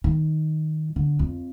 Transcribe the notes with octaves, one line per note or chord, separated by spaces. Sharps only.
D#3
D3
F2